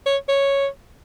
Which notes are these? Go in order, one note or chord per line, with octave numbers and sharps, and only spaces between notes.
C#5
C#5